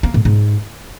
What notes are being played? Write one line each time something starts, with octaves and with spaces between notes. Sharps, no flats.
A#3
A2
G#2